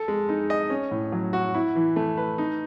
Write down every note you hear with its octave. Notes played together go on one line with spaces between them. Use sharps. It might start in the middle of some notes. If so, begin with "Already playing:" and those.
Already playing: A4
G#3
D#4
D#5
C#4
A2
F#3
F#4
E4
E3
A3
B4
D#4